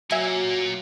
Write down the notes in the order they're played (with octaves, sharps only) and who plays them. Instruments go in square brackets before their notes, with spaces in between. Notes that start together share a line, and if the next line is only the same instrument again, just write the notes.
[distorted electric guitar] A#2 A#3 [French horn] F#3 [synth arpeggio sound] E5 G#5